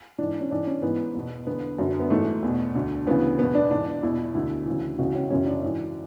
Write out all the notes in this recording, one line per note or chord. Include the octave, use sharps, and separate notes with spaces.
G#2 E3 D4
C#4
G#2 E3 D4
C#4
G#2 E3 B3
E2 B2
E2 D3 B3
F#2 D3
B3
G#2 E3 A3
E2 B2
D2 D3
D2 C#3 E3 B3
E2 B2 B3
D4
G#2 E3 D4
E2 B2 E4
E4
D2 D3 E4
D2 C#3 E3
C#2 C#3 E3 F#4
C#4
F#2 C#3 E3 C#4
D4
G#2 E3